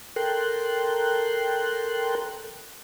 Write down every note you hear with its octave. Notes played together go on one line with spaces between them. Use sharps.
A4 A#4 G5 C6 F#6